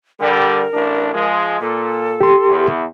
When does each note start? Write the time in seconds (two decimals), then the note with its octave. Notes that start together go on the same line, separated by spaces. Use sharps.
0.20 D3 G3 A#4
0.74 A1 D4
1.14 F3 G#3
1.61 A#2 A4
2.21 G4 C6
2.49 E2